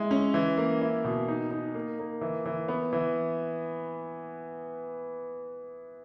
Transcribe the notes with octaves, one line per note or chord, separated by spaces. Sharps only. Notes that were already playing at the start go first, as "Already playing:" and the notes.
Already playing: G#3 E4
C#4
E3
A#3
E4
B2
D#4
D#4
A#3
A#3
E3
E3
B3
E3